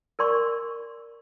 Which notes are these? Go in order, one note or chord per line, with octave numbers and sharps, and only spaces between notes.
A#4 D5 C6 C#6